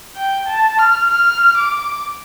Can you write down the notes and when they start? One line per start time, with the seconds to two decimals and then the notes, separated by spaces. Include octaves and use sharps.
0.17 G5
0.48 A5
0.79 F6
1.10 F6
1.57 D6